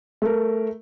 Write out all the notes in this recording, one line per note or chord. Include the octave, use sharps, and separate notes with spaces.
A3 A#4